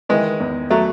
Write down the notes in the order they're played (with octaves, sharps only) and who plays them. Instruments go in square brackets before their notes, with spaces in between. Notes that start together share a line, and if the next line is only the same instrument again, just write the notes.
[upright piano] D#3 [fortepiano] E3 G#3
[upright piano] E2
[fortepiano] F#3 A3